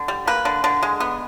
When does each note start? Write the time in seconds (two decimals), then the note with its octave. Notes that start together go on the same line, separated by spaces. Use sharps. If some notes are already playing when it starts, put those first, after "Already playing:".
Already playing: D3
0.08 G3
0.27 A#3 B4
0.45 D3
0.64 D3
0.83 G#3
1.00 B3